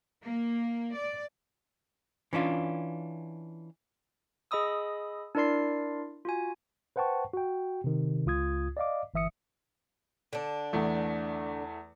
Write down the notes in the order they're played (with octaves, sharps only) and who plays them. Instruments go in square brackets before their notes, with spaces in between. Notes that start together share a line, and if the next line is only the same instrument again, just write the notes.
[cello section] A#3
D5
[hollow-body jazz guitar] E3 C#4 D4 F4
[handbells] G#4 D#5 B5 D#6 E6
D4 E4 A#4 D5 C6 C7
F4 F#4 G#5
[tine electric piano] B4 C5 F#5 G5 A5 C#6
F#4 G5
C3 D#3
C#2 F4 D#6 G#6
D5 D#5 F5 D6
G1 E3 E5 D#6 C#7
[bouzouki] D3 D4
[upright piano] E2 A3